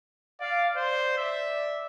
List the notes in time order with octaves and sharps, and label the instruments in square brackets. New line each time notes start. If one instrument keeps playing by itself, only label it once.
[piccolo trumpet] D5 [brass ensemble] F5
[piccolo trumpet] C5 [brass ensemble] D5
[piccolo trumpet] E5